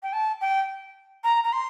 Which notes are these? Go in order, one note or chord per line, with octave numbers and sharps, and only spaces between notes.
G5
A5
G5
A#5
A#5
C6